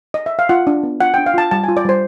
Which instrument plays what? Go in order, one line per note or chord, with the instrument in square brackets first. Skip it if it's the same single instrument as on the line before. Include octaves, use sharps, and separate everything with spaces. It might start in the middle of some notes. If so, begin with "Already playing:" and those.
[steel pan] D#5
E5
F5
F4 F#5
D4
B3
F4 F#5
D4 G5
F5
F4 A5
G3 A5
F4 G#5
D5
G3 C5